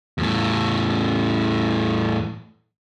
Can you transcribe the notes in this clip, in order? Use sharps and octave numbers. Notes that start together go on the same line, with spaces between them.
E2 A2